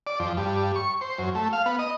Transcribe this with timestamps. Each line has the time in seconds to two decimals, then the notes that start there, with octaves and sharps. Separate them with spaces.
0.07 D5
0.20 F2
0.37 G2
0.76 C#6
1.01 C5
1.18 F#2
1.35 A3
1.53 F5
1.66 B3
1.79 D#5